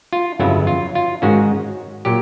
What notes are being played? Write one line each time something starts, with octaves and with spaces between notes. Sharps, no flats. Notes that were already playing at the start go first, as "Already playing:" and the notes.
F4
G1 F2 C#3 F#3 B3 E4
F4
F4
G#2 D#3 G#3 C#4 F#4
A#2 F#3 G4